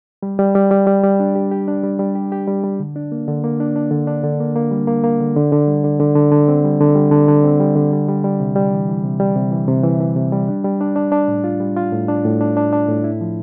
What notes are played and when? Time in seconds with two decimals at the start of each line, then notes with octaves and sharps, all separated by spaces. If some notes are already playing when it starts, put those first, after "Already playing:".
0.23 G3
0.39 G3
0.55 G3
0.71 G3
0.87 G3
1.03 G3
1.20 D4
1.35 G4
1.51 G4
1.68 D4
1.83 G3
1.99 G3
2.15 G4
2.32 G4
2.47 G3
2.64 G3
2.79 D3
2.96 D4
3.12 A#3
3.28 D3
3.44 A#3
3.60 D4
3.76 D4
3.91 D3
4.07 D4
4.23 D3
4.40 A#3
4.56 A#3
4.71 G3
4.87 A#3
5.04 A#3
5.20 D3
5.36 D3
5.52 D3
5.67 G3
5.84 D3
6.00 D3
6.16 D3
6.32 D3
6.48 C4
6.64 G3
6.80 D3
6.95 G3
7.11 D3
7.28 D3
7.44 C4
7.60 G3
7.76 D3
7.92 G3
8.08 G3
8.24 G3
8.40 C3
8.56 G3
8.72 E3
8.88 E3
9.04 C3
9.20 G3
9.36 C3
9.51 E3
9.68 C3
9.83 E3
10.00 E3
10.16 C3
10.32 G3
10.48 D4
10.64 G3
10.81 D4
10.96 D4
11.12 D4
11.28 A2
11.44 F4
11.60 G3
11.77 F4
11.92 A2
12.08 D4
12.25 A2
12.41 D4
12.57 D4
12.73 D4
12.88 A2
13.04 E4
13.21 F3